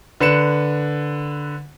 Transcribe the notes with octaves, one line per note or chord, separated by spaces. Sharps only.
D3 B4 C#7 E7